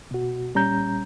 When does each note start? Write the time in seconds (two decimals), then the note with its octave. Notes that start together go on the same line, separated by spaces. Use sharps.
0.11 B2 F#4
0.55 A#2 G3 C#4 A#5 G6